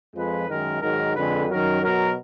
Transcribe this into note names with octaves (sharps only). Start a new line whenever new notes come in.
F2 F3 G#3 B4
F#2 D#3 G#3 A#4
G#2 D#3 F#3 A#4
F2 D3 G#3 B4
F#2 D#3 F#3 A#4
B2 F#3 A#4